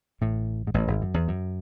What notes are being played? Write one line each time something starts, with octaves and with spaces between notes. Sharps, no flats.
A1 A2
G#2
A1 A2
G#1 G#2
F#2
E2
F#2